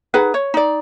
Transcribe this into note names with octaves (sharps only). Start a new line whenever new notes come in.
D#4 G#4 B4 F#5
C#5
D#4 D5